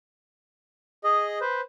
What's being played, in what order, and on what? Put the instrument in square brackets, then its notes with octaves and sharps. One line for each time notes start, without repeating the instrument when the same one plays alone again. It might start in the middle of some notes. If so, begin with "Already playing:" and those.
[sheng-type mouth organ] G#4 D#5
B4 C5